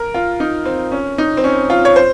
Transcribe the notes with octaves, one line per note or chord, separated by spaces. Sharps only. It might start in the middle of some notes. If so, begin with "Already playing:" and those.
Already playing: A#4
F4
D#4
C4
C#4
D#4
C4
C#4
F4
C#5
C5